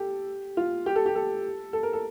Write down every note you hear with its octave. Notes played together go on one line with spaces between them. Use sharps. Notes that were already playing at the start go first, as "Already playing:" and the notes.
Already playing: G4 A4
F4
G4
A4
G4
A4
A4
A#4
A4